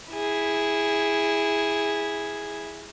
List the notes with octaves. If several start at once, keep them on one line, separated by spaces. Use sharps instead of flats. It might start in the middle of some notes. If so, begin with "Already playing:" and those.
E4 G#4